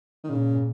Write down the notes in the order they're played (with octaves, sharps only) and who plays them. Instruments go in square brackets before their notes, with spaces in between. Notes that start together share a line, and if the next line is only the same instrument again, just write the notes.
[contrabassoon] D#3
[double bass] A#2 [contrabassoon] C#3